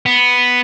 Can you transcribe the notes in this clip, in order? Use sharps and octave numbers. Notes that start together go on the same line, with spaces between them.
B3